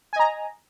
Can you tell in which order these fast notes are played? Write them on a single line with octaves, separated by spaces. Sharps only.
G#5 D#5 A#5